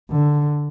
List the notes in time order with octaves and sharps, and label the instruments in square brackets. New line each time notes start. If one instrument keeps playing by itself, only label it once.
[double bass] D3